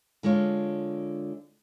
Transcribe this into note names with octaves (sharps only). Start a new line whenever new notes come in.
D3 G#3 F4 C#5